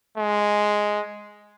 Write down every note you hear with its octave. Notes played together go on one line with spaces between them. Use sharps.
G#3